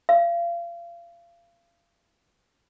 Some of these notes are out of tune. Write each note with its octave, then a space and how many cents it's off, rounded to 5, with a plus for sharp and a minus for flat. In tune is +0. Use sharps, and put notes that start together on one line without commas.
F5 -30